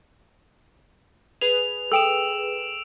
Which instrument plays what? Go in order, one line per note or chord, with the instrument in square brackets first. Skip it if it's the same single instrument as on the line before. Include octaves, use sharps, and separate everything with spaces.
[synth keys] G#4 B4 [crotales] F7
[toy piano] A4 G5 D#6 [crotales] E6 D7 E7